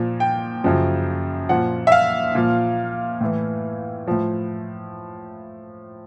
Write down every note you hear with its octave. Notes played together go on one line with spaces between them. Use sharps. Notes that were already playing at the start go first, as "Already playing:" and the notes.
Already playing: A#2 F3
G5
F#2 C#3 F3
A#2 F3 F#5
E5
F5
A#2 F3
A2 E3
A2 F3